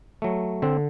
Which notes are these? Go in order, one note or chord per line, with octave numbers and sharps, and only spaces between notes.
F#3 A3
D3 C4